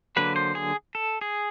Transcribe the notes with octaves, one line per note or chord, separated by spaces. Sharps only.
D3 F#3 A#3 B4
C5
G#4
A4
G#4